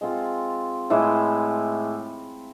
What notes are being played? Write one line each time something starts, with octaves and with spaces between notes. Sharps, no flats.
G#3 C4 F4 A4
A2 E3 G#3